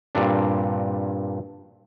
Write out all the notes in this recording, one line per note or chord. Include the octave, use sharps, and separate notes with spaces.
G2 A#2 C4 D4